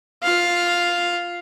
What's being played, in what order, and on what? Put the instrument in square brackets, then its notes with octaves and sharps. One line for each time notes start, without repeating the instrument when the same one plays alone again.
[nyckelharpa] F4 F5